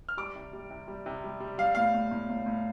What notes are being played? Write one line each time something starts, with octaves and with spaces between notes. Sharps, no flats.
F6
G3 D6
C3
G3
C3
G3
C3
G3
G3
G3 F5
A2 F5
A2
A2
A2
A2